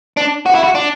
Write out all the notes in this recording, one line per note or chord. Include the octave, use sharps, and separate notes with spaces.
D4
F#4
E4
F#4
D4